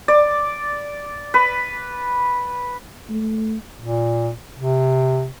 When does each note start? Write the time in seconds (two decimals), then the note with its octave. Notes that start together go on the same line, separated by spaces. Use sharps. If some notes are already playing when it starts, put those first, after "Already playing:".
0.08 D5
1.34 B4
3.10 A3
3.80 A#2
4.57 C3